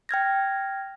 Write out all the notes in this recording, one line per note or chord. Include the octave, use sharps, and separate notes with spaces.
G5 F6 G#6 A#6